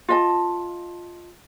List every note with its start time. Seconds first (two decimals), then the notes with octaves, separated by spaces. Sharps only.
0.08 F4 D#5 A5